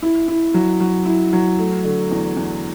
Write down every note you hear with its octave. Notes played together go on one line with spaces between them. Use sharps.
E4
E4
F#3
F#3
E4
F#3
A3
D3
E2
E2